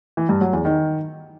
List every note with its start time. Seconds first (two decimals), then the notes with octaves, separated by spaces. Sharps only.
0.17 E3
0.29 G2
0.41 F#3
0.53 E2
0.65 D#3